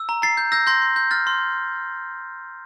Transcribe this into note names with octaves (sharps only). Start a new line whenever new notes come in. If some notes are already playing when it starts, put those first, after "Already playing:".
Already playing: E6
A#5
A#5 A6 C7
G6
E6 G6 A#6
C6 G6 A#6
C6
G6
F6 A6
C6